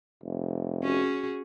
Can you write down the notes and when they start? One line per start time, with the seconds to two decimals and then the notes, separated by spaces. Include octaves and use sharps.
0.24 F1
0.83 C#4 F#4 G#4